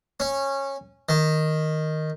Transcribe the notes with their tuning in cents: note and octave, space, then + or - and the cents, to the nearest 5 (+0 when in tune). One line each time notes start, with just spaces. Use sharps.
C#4 -15
D#3 +0